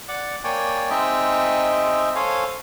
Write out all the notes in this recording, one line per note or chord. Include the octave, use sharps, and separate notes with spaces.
D5 F#5 D6
A#3 C#5 D5 G5 G#5
G#3 C4 D#4 D#5 E5 G5
A4 C5 C#5 F5 G#5